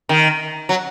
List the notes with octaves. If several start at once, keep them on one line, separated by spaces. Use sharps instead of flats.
D#3
F#3